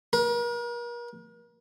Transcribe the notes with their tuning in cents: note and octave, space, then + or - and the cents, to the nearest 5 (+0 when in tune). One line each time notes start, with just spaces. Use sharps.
A#4 +40